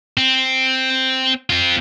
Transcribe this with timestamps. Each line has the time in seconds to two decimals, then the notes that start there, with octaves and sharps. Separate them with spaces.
0.17 C4
1.50 C4 F4